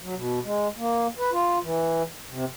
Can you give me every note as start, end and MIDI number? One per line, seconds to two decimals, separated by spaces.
0.02 0.15 54
0.15 0.39 47
0.44 0.67 56
0.77 1.07 58
1.18 1.31 71
1.32 1.58 65
1.62 2.03 52
2.29 2.45 48